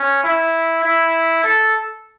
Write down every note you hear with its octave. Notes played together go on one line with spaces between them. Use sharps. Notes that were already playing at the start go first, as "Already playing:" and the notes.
Already playing: C#4
E4
E4
A4